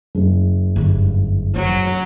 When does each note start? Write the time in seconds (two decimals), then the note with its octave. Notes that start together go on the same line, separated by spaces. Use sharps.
0.15 F#1
0.76 G1 E4
1.56 F3 F#3